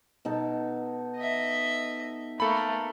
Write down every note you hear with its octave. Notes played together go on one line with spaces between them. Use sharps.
B2 D#4 A4
D#5 E5
A3 A#3 A4 B5